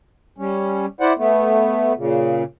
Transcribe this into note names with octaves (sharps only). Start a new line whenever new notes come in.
G3 C#4
E4 C5 D5 F#5
A3 B3
A#2 C#3